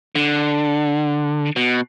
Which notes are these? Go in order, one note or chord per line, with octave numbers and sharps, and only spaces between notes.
D3
B2